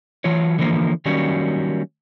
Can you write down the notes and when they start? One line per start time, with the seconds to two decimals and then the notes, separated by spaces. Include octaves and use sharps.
0.24 E3 F#3 F4 C#5
0.59 D3 E3 F3 A#3 C5
1.05 D#3 F#3 G3 A#3 C#4 F#4